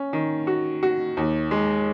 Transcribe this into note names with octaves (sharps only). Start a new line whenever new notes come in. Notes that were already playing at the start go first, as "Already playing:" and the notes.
Already playing: C#4
D#3
F#4
F#4
D#2
G#3